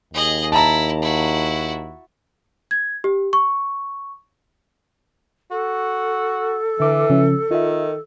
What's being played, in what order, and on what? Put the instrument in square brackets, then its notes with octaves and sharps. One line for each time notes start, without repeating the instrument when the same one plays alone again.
[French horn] D#2 [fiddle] G#4 D#5
[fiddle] E4 [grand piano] A5 A#5
[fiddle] E4 F#4
[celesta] G#6
G4
C#6
[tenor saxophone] F#4 [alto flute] A4
[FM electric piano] D3 D6 [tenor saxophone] E3
[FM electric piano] C#3 F3 C#4
[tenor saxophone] D#3 [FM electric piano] F4 E5